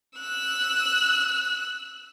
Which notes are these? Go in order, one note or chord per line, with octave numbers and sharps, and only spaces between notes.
E6 F#6